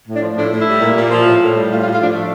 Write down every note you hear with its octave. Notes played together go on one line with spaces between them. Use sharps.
A2
D4
F3
A2 D4
A2
E4
G3
A#2
A#2
F3
A2
A2
G3
A2 F4
F4
A2
F4
F3 D4
A3 D4